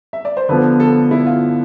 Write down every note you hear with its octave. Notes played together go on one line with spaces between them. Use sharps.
E5
D5
C5
D3 F3 B3 B4
A4
E4
F4